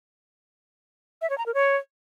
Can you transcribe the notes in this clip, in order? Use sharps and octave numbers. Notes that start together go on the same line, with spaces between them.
E5
C#5
A#5
A#4
C#5